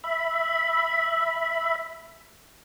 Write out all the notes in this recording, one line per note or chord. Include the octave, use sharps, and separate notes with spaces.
E5 B5